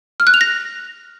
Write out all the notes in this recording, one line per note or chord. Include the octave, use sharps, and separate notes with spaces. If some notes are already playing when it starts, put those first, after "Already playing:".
F6
F#6
F7
A#6